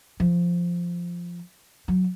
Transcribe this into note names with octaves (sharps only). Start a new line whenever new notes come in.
F3
F#3